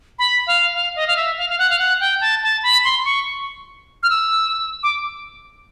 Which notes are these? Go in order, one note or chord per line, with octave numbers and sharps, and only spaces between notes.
B5
F5
F5
D#5
F5
E5
F5
F5
F#5
F5
F#5
G5
A5
A5
B5
C6
C6
C#6
F6
E6
D6